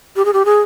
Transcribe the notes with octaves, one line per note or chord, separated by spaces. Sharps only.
G4
G#4
G4
G#4